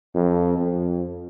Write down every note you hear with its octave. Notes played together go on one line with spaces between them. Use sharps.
F2
F2